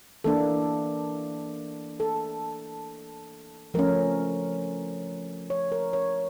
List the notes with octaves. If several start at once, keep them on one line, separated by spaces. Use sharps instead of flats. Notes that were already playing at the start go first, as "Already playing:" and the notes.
E3 A#3 D4 A4
A4
F3 A3 C#4 A#4
C#5
A#4
C#5